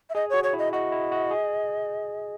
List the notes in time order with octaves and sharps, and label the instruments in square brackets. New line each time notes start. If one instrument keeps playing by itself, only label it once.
[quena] E5
[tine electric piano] G#4 [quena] D#5
[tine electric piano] F#4 [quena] C#5
[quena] C#5
[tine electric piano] E4
[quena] D#5
[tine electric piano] F#4 [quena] D#5
[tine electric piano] E4
F#4
G#4